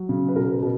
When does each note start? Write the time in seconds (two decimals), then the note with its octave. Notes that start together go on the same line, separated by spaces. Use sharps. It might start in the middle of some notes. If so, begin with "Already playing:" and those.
Already playing: F#3
0.09 C#3
0.28 B4
0.36 B2 A#4
0.53 A#4
0.62 B2